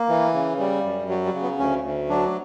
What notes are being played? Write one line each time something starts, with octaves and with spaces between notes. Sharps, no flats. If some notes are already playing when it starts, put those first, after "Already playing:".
Already playing: A#3
E3
C#3
G3
F#2
F#3 G3
G3
C#3
B3
D2 C#4
D2
F#3 D4